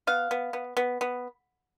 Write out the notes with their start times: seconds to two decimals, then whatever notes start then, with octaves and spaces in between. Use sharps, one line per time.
0.07 B3 F5
0.31 B3
0.53 B3
0.77 B3
1.01 B3